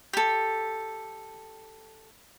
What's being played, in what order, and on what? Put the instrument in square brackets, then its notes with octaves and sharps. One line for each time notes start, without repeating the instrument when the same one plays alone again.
[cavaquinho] G4 A4